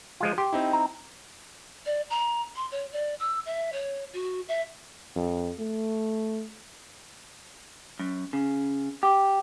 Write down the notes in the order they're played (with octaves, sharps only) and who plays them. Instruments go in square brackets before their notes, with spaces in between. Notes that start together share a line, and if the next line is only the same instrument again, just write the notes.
[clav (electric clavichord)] F3 G#3 F4
[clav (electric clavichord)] G4 [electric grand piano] C6
[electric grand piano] C4 D#4 E4
[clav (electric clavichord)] A#5
[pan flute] D5
A#5
C6
C#5
D5
E6
E5
C#5
F#4
E5
[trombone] F2
A3
[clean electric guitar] F#2
C#3
G4